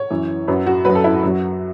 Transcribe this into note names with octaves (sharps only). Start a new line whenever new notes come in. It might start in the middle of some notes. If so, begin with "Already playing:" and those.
Already playing: C#5
F#2 E3
F#2 F#3 B4
F#4
F#2 F#3 B4
A4
E4
F#4
F#2 F#3